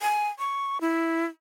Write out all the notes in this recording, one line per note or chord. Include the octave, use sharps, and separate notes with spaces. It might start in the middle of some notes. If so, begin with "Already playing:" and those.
G#5
C#6
E4